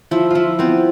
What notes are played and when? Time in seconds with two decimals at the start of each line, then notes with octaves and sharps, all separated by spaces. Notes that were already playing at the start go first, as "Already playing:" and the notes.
0.11 F3 E4
0.31 F3 E4 F4
0.59 B3 C4